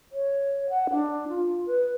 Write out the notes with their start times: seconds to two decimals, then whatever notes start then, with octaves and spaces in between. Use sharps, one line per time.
0.12 C#5
0.70 F#5
0.91 D4
1.29 F4
1.66 B4